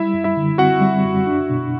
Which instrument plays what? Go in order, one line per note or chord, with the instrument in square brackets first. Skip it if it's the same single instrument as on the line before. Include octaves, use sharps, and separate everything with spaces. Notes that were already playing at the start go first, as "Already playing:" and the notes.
Already playing: [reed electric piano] G3 [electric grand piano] E4 E5
[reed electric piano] F#2
[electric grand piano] E4 E5
[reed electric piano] D3
[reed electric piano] C4 [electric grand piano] F#4 F#5
[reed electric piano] G3
F#2
D4
B2